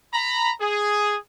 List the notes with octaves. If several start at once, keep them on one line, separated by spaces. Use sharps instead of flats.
A#5 B5
G#4